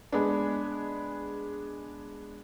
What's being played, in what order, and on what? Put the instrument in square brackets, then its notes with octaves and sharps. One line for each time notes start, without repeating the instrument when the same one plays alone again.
[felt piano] G#3 B3 D4